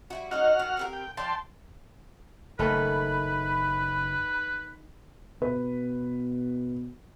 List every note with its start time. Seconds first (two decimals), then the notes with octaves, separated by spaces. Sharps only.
0.10 G3 E4 F#4
0.31 G#3 C#4 D#4 F#4 F#5 F6
0.59 D#3 F5
0.77 C4 G4 A#4
0.93 G5
1.17 F3 D5 G5 A5 C6
2.59 F#1 D#3 A3 C#4 B4 B5
5.42 B2 B4